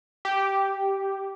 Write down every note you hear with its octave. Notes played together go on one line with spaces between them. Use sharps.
G4